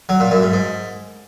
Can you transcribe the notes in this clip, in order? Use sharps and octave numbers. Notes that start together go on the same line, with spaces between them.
F#3
A#2
F#2
G#2
G#2